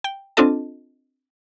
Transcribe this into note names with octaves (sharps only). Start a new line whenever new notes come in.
G5
C4 D4 F4 A4 D#5 A5